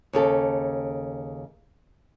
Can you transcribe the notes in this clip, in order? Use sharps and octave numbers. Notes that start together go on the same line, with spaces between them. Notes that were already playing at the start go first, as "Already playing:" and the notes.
D#2 C#3 A4